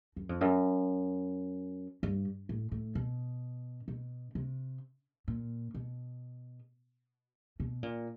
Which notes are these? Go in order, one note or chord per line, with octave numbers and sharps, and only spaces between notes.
F#2
F2
F#2
G2
A2
A2
B2
B2
C3
A#2
B2
B2
A#2